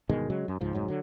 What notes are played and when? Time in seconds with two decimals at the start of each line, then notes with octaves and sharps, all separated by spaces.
0.09 G1 B2 D#3 G#3
0.30 C#3 F#3 G#3
0.48 F#2
0.61 C#2 G#2 F3
0.75 F1 G#2 F#3
0.88 D3 F#3